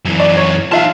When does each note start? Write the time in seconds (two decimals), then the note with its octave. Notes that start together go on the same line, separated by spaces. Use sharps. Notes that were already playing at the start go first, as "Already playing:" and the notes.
0.05 F#2 E3
0.20 D5
0.37 C#5
0.72 D#4 F4 E5 F5 A5